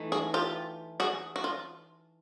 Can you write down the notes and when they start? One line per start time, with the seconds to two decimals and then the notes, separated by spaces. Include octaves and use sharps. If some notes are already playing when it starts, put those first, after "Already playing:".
Already playing: E3 A3 D#4
0.12 F#4 G#4
0.34 F4 G4
1.00 F#4 G#4
1.36 F#4
1.44 F4